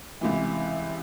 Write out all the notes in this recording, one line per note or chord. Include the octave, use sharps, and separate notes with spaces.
C#2 C3 E3